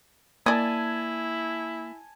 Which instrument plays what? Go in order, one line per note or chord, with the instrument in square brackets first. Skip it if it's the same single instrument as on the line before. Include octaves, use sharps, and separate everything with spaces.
[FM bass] A#3 [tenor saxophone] E4 [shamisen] D5 D#5 [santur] G#5 A5